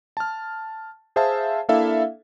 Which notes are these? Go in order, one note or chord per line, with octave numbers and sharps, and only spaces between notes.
A5 F6
G#4 C5 E5 F5 A5
A#3 D4 E4 A4 E5 F5